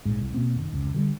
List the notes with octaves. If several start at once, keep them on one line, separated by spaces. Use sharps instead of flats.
A#1 G#2
C2
B2 A#3 C4
F#1 D#3
F1 C#2
D3 E3 G3